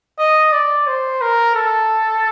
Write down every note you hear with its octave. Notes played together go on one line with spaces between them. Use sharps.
D#5
D5
C5
A#4
A4